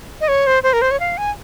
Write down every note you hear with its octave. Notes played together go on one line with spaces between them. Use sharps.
D#5
C#5
C5
C5
A#4
C5
C#5
F5
G#5